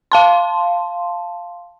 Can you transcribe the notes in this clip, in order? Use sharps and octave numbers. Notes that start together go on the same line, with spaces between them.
F5 A5 C6